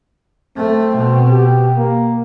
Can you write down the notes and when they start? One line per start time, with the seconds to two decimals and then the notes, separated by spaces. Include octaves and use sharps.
0.57 A3 C4
0.97 B2
1.31 G4
1.77 A#3